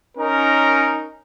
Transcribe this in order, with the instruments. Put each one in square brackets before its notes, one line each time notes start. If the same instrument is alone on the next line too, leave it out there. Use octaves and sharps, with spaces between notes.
[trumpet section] C#4 D#4 A#4